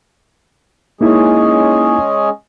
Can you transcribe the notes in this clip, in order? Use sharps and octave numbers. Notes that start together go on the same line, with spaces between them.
G#3 A#3 C#4 D#4 E4 G#4